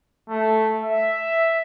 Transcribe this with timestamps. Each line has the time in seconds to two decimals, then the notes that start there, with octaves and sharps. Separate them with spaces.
0.27 A3
0.81 E5